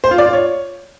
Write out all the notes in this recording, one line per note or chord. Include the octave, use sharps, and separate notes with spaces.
C5
F4
D5
F4
C#5